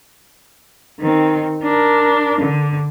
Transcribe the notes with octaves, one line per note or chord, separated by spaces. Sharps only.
D#3 C4
D4 A#4
D3